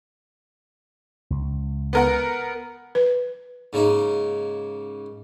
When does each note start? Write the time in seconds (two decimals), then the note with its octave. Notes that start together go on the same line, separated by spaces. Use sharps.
1.30 C#2
1.93 B3 A#4 F#5
2.95 B4
3.73 G#2 C#3 A#3 D#4